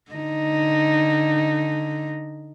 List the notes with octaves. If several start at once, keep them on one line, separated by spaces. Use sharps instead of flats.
D3 D#4